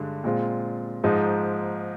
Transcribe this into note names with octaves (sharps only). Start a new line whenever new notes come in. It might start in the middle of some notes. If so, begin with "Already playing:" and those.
Already playing: G2 D3 G#3
A#2 G#3 C4 F4
G#2 F3 G#3 D#4